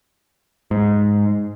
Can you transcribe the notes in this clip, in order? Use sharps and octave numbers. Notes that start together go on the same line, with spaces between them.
G#2